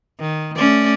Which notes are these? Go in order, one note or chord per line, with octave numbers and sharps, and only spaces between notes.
D#3
A3 C#4 D5